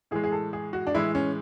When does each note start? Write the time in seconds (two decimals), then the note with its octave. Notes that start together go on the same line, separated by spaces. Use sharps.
0.11 A2 E3 G#3 G#4
0.24 G#4
0.32 A4
0.53 G#4
0.73 F#4
0.87 D4
0.94 A2 E3 G#3 E4
1.15 C#4